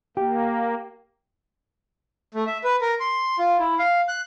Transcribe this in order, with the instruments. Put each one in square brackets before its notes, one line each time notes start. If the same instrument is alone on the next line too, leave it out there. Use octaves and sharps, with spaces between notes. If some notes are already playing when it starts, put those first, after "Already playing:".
[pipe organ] A#3 [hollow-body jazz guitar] G4
[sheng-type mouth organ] A3
E5
B4
A#4
C6
F4
E4
F5
F#6